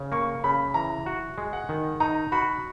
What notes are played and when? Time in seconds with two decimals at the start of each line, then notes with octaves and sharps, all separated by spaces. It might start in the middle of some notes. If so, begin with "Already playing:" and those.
Already playing: C#3
0.12 A#3 C#6
0.44 C#3 B5
0.74 E3 A#5
1.06 F#4
1.38 G#3
1.53 F#5
1.69 D#3
2.00 D#4 A#5
2.32 F#4 B5